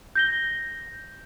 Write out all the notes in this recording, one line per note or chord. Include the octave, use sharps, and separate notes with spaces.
G6 A#6 G7